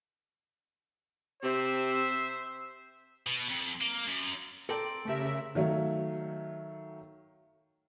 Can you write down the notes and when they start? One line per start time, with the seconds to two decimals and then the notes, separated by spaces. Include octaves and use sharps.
1.43 C3 C5 E5
3.27 B2
3.48 F2
3.81 A#3
4.08 F#2
4.69 C4 A4 A#4 D5 G5
5.05 C#3 A3 G4 A#4 E5
5.55 D#3 F#3 A3 C#5 F5